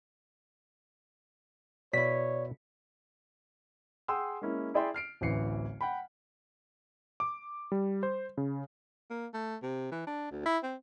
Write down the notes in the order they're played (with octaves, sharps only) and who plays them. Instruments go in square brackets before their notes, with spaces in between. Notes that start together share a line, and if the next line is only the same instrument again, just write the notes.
[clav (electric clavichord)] B2 E4 [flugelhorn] C#5 [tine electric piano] D5 [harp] B6
[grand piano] G#4 F#5 G5 C6 D#6 E6
G#3 A#3 C#4 E4
E4 G#4 D5 E5 G5 C6
F6 C7 D7
D1 A1 E3 C7 C#7
F#5 G5 B5
[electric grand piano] D6
G3
C5
C#3
[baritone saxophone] A#3
A3
C3
E3
D4
D2
E4
C4